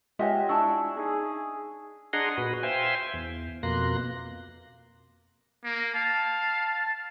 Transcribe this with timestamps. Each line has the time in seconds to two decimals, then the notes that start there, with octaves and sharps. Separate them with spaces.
0.19 G#3 F4 G4 C#5 D#5 E5 F#5 G#5
0.49 D4 E4 G#5 A5 C#6 E6
0.97 D#4 G#4
2.13 D4 G#4 D#5 F#5 A#5 C6
2.37 A#2 F#4 B4
2.63 C5 E5 F5 G5 G#5 C6
3.14 E2
3.63 F2 B2 A#3 C6 F#6 A#6
5.64 A#3
5.95 F5 A5